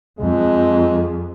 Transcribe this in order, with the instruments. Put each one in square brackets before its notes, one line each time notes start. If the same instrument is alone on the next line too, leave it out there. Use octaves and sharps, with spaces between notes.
[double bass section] F2 [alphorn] G#3